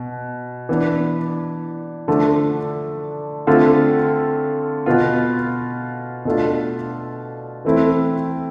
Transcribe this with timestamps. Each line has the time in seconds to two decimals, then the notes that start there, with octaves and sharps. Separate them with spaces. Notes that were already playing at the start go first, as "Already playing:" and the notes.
Already playing: B2
0.69 E3 B3 D4
2.08 D3 F3 A3 D4
3.47 D3 A3 C4 F4
4.86 B2 B3 F4
6.25 B2 A3 D4 F4
7.65 E3 A3 C4 E4